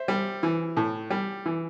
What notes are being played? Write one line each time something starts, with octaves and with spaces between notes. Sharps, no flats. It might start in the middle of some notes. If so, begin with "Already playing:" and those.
Already playing: C5 E5
G3
E3
A2
G3
E3